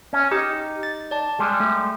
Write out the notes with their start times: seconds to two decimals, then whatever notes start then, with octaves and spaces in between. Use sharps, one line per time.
0.13 C#4
0.31 D#4 G4
0.83 A6
1.11 D5 A5
1.39 G3 G#3
1.60 A3